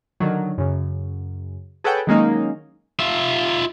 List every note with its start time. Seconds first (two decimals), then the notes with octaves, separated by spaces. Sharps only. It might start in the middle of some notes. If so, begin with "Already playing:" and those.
0.20 D3 D#3 F#3
0.58 F#2 C#3
1.84 G#4 A4 B4 C#5 F#5 G5
2.07 D#3 F#3 G#3 A#3 C#4 D#4
2.99 F4 E5